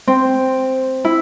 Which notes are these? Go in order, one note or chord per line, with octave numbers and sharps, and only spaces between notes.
C4
E4